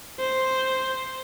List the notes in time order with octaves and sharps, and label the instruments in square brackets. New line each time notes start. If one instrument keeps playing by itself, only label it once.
[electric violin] C5